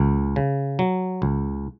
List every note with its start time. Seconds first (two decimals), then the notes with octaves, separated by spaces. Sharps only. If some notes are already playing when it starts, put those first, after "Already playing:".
Already playing: C#2
0.36 C#3
0.79 F#3
1.22 C#2